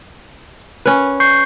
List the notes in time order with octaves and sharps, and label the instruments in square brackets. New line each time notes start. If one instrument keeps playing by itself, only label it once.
[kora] C#4 B4
[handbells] C#6 G6 C7